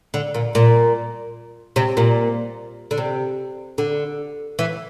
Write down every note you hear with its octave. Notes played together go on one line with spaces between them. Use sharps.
D3
A#2
A#2
C3
A#2
D3
C3
D3
E3